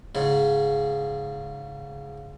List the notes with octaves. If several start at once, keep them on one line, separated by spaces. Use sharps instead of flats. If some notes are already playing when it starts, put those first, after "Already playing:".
G#2 C#3